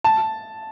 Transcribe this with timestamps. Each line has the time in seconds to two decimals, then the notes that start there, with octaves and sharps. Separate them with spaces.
0.04 A5